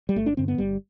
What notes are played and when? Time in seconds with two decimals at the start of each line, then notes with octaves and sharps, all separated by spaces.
0.09 G3
0.16 G1 A3
0.26 D4
0.37 G2 D3 C4
0.48 B3
0.58 G1 G3